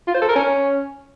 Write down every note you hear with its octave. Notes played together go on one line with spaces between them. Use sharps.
F4
C5
A4
A#4
C#4